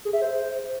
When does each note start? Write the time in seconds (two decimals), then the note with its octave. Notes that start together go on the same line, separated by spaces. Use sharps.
0.05 G#4
0.13 E5
0.22 C5